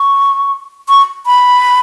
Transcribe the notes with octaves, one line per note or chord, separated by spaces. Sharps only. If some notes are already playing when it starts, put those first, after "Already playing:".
Already playing: C#6
C#6
B5